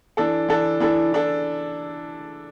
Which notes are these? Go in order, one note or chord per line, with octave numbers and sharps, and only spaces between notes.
E3 D4 A4
E3 D4 A4
E3 D4 A4
E3 D4 A4